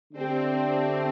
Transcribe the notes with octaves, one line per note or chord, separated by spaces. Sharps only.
D3 A3 C4 D4 G4